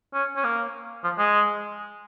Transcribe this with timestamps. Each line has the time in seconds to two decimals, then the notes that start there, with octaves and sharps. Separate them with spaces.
0.14 C#4
0.36 C#4
0.44 A#3
1.04 F3
1.18 G#3